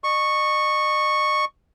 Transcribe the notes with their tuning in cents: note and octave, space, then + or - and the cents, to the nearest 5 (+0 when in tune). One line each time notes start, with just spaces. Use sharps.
D#5 -45 C#6 -5